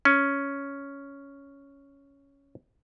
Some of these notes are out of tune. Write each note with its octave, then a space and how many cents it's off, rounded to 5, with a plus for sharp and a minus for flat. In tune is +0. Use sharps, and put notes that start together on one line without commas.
C#4 +5